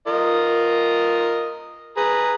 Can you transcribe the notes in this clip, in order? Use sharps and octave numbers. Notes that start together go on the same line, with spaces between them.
F4 A#4 D#5
G#4 B4 A#5